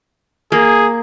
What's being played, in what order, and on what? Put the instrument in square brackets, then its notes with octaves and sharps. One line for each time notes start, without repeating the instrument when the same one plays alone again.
[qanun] A#3 [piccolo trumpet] G#4